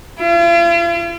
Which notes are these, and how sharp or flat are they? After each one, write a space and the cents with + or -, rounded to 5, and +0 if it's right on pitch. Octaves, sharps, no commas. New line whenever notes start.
F4 -45